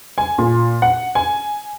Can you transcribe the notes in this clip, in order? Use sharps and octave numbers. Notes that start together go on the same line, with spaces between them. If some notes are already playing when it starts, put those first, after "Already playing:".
G#5
A#2
F#5
G#5